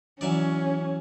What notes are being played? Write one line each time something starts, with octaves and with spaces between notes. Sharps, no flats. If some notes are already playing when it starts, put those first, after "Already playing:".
E3 F#3 C#4 D5